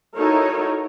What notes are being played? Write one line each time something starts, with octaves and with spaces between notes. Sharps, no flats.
D#4 E4 F#4 A4 A#4 C#5